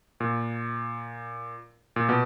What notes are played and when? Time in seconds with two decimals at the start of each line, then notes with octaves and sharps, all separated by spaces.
0.20 A#2
1.96 A#2
2.09 B2